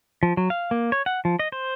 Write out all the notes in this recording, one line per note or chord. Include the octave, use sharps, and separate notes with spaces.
F3
F#3
F5
A#3
C#5
F#5
F3
D#5
C5